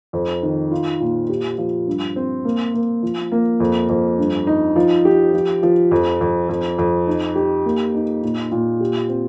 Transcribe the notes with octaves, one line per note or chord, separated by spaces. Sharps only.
F2
D#3
F4
A#2
G4
F3
G2
C4
A#3
A#3
F3
A#3
F2
F2
G2
D#4
F3
G4
F3
F3
F2
F2
F2
F2
D#4
G4
A#3
D#4
A#2
A#2
G4
C4